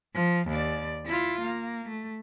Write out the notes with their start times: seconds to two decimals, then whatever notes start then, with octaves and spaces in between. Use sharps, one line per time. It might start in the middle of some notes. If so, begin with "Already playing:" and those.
0.14 F3
0.48 D#2 D5
1.06 E4 F4
1.41 A#3
1.88 A3